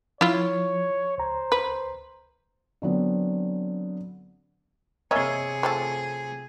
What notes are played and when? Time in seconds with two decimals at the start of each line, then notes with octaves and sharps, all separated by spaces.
0.21 F3 E4 F4 C#5
1.18 C#2 C5 A#5
1.52 B4
2.82 D3 F#3 B3 C4
5.11 C3 A#3 G#4 C#5 D#5 E5 G#5
5.63 F3 A3 A4